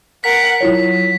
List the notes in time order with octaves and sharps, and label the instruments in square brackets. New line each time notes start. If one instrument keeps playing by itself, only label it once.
[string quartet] A#4 F#5 [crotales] B6
[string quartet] F#3 [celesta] E4 F4 C#5